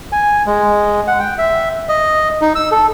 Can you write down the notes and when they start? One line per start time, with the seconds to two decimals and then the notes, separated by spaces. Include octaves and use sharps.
0.12 G#5
0.47 G#3
1.07 F#5
1.20 G5
1.38 E5
1.89 D#5
2.41 D#4
2.55 E6
2.72 A4